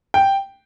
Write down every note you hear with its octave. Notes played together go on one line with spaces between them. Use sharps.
G5